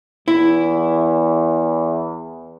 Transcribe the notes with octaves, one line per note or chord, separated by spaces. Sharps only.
E2 E4